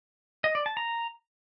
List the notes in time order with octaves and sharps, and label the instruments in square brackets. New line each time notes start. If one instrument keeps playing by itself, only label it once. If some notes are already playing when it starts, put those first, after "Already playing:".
[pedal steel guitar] D#5
D5
A5
A#5